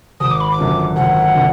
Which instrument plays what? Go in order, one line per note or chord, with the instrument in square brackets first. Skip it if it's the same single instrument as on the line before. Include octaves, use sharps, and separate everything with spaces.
[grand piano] G#1 [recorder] D#6
[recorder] D6
B5
D6
[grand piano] F#2 D3 F3
[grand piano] G#1 [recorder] F#5
[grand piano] D3 F3